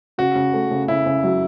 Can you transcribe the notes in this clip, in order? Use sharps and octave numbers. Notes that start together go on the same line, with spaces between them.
C#3 F#4
C#3
A3
C#3
C#3 E4
C#3
F#3